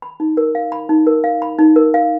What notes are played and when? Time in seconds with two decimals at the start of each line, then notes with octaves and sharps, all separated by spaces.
0.02 B5
0.20 D#4
0.37 A#4
0.55 F5
0.72 B5
0.89 D#4
1.07 A#4
1.24 F5
1.42 B5
1.59 D#4
1.76 A#4
1.94 F5